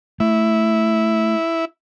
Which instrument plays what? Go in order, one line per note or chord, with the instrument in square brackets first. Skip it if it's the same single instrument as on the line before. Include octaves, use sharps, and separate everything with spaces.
[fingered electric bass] A3 [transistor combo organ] E4